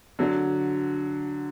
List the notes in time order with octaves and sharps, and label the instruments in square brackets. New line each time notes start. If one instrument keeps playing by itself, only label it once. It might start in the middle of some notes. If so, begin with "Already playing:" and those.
[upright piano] D3 F#3